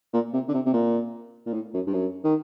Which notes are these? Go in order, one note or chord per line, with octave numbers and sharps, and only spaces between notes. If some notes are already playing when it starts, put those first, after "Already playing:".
A#2
C3
D3
C3
C3
A#2
A#2
A2
F#2
G2
F#2
D#3